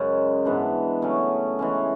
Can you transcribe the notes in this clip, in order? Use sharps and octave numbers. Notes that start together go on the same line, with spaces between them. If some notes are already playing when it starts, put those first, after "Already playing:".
Already playing: F#2 C#3 G#3 C#4
G#2 E3 B3 D4
C#3 F#3 A3 C#4
E3 G#3 C#4